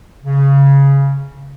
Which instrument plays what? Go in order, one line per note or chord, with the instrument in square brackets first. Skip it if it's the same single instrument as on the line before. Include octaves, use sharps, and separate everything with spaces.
[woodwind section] C#3